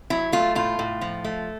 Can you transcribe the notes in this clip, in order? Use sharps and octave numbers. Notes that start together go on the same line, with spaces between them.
F#3 E4
A3 F4
A2 F4
A2
F3
A3